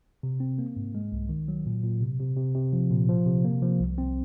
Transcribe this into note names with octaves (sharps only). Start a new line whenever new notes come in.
C3
C4
A#3
G#2
G#3
C2
D#3
F#3
A#2
A#2
C3
C3
C3
C3
F3
A#2
F3
C3
A#3
F3
C2
C4